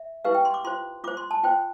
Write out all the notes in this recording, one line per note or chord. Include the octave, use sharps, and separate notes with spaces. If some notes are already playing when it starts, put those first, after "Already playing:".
Already playing: E5
E4 G4 B4 F5
G5
C6
D6
F4 C5 C6
F4 C5 D6
C6
A5
F4 C5 G5